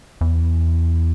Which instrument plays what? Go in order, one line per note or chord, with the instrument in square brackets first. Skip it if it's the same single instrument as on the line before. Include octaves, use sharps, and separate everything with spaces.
[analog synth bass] E2